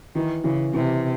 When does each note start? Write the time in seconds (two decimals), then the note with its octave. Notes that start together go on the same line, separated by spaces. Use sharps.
0.15 D#3 E3
0.44 C#3 E3
0.73 C3 E3